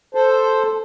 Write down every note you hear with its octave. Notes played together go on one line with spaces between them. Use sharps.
A4 C5